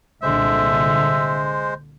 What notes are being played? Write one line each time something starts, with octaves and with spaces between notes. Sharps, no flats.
C2 A#2 D3 G#3 C5 E5